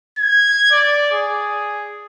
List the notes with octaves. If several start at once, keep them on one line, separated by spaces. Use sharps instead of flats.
G#6
D5
G#4